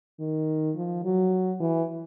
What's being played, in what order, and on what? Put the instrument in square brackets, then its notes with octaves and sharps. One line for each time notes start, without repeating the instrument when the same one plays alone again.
[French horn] D#3
F3
F#3
E3